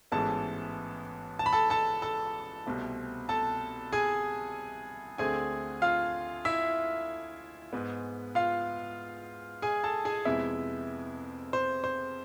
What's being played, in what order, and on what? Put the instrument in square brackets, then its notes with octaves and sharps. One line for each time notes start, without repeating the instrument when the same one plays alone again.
[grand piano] A1 G#2 E3 G#3 B3 A4 A5
A5
B5
A4 A5
A4 A5
A4 A5
C2 B2 A3 C4
A4 A5
G#4 G#5
D2 D3 A3 C4 G#4 G#5
F4 F5
E4 E5
G#2 G#3 B3
F4 F5
G#4 G#5
A4 A5
G#4 G#5
F2 C3 G#3 B3 E4 E5
C5
C5